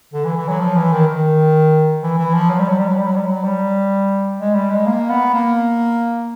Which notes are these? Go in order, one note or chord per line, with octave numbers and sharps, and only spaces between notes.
D3
E3
E3
F#3
F3
E3
D#3
D#3
E3
E3
F3
F#3
G3
F#3
G3
F#3
G3
F#3
G3
F#3
G3
G#3
G3
G#3
A#3
B3
A#3